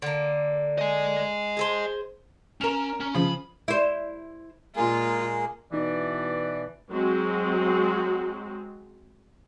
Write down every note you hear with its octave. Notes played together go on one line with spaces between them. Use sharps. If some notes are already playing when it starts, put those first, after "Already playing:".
D3 A#3
D#5 G#5
G#4 A4 C5
C#4 A#4 E7 F7
C#4
C#3 F3 B5
E4 C5
A#2 G#3 A#3 F4 G#4
B2 E3 D#4 E4 D5
F#3 G#3 C4 F#4